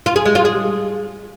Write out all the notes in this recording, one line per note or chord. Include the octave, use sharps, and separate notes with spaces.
F4
G#4
G#3
F4
G#4